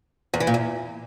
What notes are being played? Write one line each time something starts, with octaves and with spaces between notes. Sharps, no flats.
E2
E3
A#2
E2